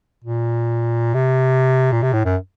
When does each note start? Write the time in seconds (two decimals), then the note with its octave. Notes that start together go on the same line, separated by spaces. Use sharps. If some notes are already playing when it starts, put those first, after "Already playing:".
0.24 A#2
1.14 C3
1.92 A#2
2.03 C3
2.13 A2
2.25 F#2